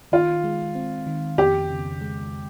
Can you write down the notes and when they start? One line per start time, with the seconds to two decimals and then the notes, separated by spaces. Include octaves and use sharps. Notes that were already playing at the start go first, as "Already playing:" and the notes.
0.12 D#3 F4
0.44 G#3
0.75 C4
1.07 D#3
1.38 F2 G4
1.70 C#3
2.01 G#3